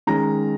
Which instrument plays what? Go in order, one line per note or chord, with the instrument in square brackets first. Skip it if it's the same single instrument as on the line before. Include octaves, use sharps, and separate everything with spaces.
[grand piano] D#3 G#3 C#4 A#5